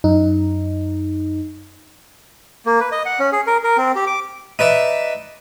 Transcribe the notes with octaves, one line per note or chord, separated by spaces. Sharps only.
F#2 D#4
A#3
B4
D#5
F#5
C#4
G#4
A#4
A#4
C4
G4
D6
D#4 B4 D5 E5